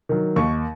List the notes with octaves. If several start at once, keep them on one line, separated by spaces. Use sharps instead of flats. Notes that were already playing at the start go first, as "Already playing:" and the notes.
D#3 F#3
D#2 C#6